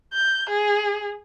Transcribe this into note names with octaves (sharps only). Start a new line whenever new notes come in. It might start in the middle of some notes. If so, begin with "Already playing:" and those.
G6
G#4